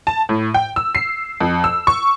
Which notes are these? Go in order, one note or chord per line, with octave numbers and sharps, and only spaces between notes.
A5
A2
G5
E6
C7
F2
E6
C#6